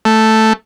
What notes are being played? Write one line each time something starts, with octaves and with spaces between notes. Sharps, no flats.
A3